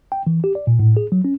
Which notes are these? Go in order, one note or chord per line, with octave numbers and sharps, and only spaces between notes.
G5
E3
G4
D5
A#2
A2
G#4
F#3
C#4